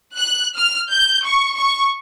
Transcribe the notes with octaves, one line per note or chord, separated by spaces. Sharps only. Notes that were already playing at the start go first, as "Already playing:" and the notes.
F#6
F6
G6
C#6
C#6